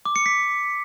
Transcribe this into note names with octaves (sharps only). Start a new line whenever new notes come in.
D6
C#7
B6